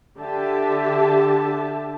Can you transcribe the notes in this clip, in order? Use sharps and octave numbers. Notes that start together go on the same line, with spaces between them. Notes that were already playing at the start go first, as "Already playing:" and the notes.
D3 G4 E5 A5